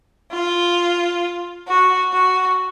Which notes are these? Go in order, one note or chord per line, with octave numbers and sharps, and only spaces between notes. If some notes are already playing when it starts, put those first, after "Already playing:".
F4
F#4
F#4